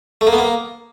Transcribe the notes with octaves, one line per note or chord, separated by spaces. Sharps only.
A3
A#3
B3
A#3